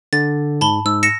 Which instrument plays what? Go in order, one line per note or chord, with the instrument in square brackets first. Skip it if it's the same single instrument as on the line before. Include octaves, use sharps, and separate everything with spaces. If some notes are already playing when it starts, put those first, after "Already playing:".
[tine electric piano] D3 [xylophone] A6
[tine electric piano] G#2 [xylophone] A5 B5 G7
[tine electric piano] G#2 [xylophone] E6
[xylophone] A#6 C#7 E7